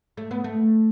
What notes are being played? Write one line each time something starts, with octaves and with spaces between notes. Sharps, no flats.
A3
B3
A3